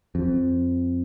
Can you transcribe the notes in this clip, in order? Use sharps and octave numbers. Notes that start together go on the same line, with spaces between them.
F2